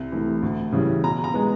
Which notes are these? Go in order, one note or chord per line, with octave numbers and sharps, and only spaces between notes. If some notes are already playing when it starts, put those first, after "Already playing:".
Already playing: C2
C3 E3 A3
D2
C#3 E3 G3
B2 A#5
A#5
G#3 B3